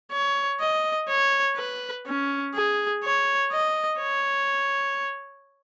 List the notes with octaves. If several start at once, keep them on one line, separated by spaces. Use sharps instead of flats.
C#5
D#5
C#5
B4
C#4
G#4
C#5
D#5
C#5